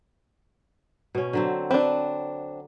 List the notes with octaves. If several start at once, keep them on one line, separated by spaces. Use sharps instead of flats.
B2 C#4
D3 F#3 C4
C4 D4 B4